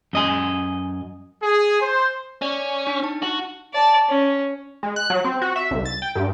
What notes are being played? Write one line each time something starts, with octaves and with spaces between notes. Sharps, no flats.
F#2 D#5 G#5
G#4
C5
C#4 D5 C#6
D4
D#4 A5
F#4
D5 A5
C#4
G#3
F#6
F#3
C4
F#4
E5
C2
A6
G5
G2